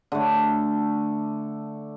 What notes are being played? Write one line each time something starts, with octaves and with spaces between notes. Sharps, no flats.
D3 A3